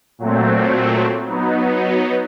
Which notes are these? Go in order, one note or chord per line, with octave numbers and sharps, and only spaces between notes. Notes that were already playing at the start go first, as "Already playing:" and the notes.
A#2 F#3 A3 C4
F#3 B3 D#4